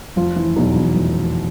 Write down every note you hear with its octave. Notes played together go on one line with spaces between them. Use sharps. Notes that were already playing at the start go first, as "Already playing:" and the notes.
F1 F3 F4
E3 E4
E2 B2 F#3 D#4
E3 E4
F1